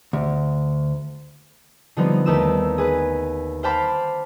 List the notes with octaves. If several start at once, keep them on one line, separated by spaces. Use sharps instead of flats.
D2
D3 F3 G3 B3 C4 D#4
D#2 A3 D#4 B4 E6 E7
G#4 B4
C5 F5 G5 A5 B5 D6